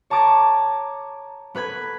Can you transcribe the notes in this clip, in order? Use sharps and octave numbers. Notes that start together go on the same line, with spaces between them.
C#5 A5 A#5 D6 G#6 A6
B3 B4 B5 G#6